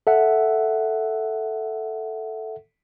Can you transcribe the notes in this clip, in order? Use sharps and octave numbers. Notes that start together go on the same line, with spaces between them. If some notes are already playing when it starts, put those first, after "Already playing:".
A4 E5 F#5